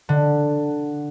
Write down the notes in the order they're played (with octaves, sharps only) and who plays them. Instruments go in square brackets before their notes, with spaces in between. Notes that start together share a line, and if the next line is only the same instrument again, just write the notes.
[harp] D3